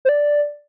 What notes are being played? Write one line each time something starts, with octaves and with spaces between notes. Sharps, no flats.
C5
D5